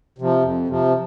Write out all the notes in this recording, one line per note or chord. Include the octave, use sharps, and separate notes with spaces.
C3 F3
F2
C3 F3